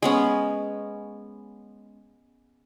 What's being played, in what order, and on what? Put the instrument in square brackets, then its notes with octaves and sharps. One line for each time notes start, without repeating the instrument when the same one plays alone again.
[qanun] G#3 B3 C#4